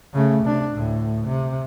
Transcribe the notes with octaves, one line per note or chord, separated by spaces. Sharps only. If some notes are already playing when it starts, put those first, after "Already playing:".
C#3 A3
C3 D4
D2 A2
C3